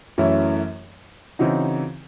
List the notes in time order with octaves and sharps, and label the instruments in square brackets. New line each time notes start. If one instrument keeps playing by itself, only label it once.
[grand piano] F#2 E3 A3 C#4 E4
C#3 E3 C4 D#4 F#4